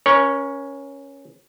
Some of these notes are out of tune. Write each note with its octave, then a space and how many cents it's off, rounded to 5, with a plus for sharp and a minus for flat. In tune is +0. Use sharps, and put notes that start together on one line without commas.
C#4 +0 A#4 +35 C#5 +0